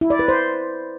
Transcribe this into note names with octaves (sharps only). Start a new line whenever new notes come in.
E4
D5
B4
C5